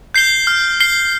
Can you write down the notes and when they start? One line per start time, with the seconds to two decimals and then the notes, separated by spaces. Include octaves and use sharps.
0.14 G6 C7 G7
0.47 F6
0.80 C7 G7